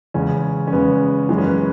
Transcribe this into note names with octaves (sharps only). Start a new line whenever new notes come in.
E2 C#3 G#3 C#4
C#4
E2 C#3 G#3 B3
F#2 E3 G#3 B3
C#4
B3